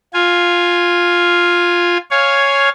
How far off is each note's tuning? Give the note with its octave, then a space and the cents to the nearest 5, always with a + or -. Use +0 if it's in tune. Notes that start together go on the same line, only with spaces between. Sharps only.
F4 +5 G#5 +0
C#5 +0 F5 +0 G#5 +0